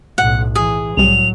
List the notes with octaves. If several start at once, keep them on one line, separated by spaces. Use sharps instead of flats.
B1 A2 F#5
E3 G#4
C2 A2 F#3 G3 F7